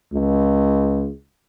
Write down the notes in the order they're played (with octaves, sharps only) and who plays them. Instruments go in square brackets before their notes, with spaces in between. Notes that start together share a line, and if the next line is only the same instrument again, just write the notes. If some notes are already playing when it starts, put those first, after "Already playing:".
[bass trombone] C#2